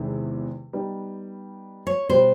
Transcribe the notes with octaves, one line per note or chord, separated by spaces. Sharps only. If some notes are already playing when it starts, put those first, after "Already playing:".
Already playing: E2 C3 D#3 G#3
G3 B3 D#4
C#5
B2 G3 B3 C5